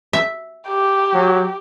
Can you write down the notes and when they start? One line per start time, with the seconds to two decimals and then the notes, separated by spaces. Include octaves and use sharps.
0.13 E5
0.67 G4
1.14 F#3